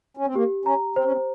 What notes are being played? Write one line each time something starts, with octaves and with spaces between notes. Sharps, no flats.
C#4
C4
A#3 G4
C#4 A#5
C4 C5
C#4
C4